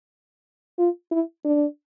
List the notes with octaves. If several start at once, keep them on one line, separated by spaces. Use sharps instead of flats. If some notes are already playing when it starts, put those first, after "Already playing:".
F4
E4
D4